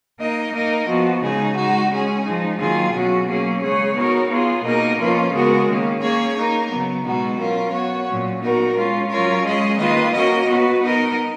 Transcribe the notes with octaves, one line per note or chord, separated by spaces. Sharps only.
A#3 D#4 A#4 D#5
A#3 D#4 A#4 D#5
F3 B3 F#4
C#3 G#3 D#4 G#4
G#3 D#4 F#4
G#3 C#4 G#4
F3 G#3 D#4
D#3 F#3 A#3 F4 G#4
B2 F#3 C#4 F#4
F#3 A#3 C#4 G#4
C#3 G#3 C#4 G#4 C#5
B3 D#4 F#4 A#4 C#5
B3 F4 G#4
B2 A#3 D#4 A#4 D#5
F3 A#3 C#4 F4 B4
C#3 G#3 B3 F#4 A#4
D#3 A#3 C#4
A#3 C#4 G#4 C#5
A#3 D#4 A#4
C#3 F#3 B3
B2 G#3 B3 D#4 F#4
F#3 C#4 F4 A#4
B3 F#4 C#5
A#2 F#3 C#4
B3 D#4 F#4 A#4
G#3 C#4 F4
F#3 C#4 F4 A#4 C#5
G#3 C#4 G#4 D#5
D#3 A#3 F4 B4 D#5
A#3 C#4 F#4 A#4 D#5
B3 F#4 B4
B3 D#4 A#4 D#5